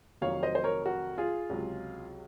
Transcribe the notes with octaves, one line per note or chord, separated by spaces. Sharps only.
F1 F2 D#3 F#3 C#5 F5
C5 D#5
C5
A#4 C#5
F#4 A#4
F4 G#4
C#2 C3 F#3